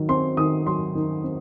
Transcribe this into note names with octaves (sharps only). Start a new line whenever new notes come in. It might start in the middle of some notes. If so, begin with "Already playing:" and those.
Already playing: D#3 F#3
C4 C6
D#3 D#6
F#3 C6
D#3
C4